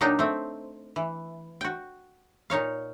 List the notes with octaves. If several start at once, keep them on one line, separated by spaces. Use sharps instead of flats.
A#2 F#3 D4 D#4 G5
A3 C4
E3
F#4 G5
A#2 D#4 C#5 F5